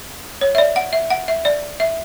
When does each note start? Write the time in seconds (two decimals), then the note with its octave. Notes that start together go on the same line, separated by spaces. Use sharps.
0.41 C#5
0.55 E5
0.58 D5
0.76 F#5
0.93 E5
1.10 F#5
1.28 E5
1.45 D5
1.80 E5